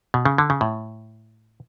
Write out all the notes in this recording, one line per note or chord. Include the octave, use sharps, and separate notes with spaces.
B2
C#3
D3
C#3
A2